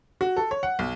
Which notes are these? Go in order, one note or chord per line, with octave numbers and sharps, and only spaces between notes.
F#4
A4
C#5
F#5
B1